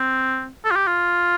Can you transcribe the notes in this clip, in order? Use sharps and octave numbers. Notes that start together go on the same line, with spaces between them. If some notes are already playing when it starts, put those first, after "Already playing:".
Already playing: C4
A4
F4
G4
F4